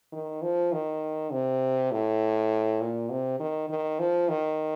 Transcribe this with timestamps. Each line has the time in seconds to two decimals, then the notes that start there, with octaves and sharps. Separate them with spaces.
0.12 D#3
0.42 F3
0.72 D#3
1.32 C3
1.92 A2
2.81 A#2
3.11 C3
3.40 D#3
3.69 D#3
3.99 F3
4.29 D#3